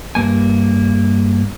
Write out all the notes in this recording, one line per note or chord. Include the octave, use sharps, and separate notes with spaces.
G2 A#3 G#5